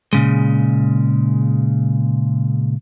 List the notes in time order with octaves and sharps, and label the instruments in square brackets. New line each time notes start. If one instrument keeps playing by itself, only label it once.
[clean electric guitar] A#2 C#3 G#3